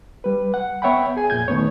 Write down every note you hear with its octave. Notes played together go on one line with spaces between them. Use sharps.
G3 B4
F#5
B3 C#5 E5 F#5 G5 B5
G#4 G#5
F2 A#2 G6 G#6
D#3 A3 B3 C#5